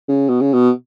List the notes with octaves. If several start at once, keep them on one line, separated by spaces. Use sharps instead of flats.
C#3
B2
C#3
B2